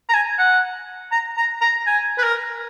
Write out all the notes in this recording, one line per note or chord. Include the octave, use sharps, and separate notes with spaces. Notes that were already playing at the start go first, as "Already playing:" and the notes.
A#5
G#5
F#5
A#5
A#5
A#5
G#5
B4
A#4